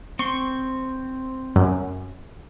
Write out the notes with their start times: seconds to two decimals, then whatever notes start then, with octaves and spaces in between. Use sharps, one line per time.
0.19 C4 C6 C#6
1.56 F#2